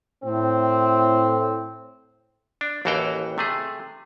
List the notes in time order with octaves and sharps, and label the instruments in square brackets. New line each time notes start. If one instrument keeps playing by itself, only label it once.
[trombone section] A2 [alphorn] C4
[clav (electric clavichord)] D4
A1 D#2 E3 F#4 F5 G5
C3 A3 G#4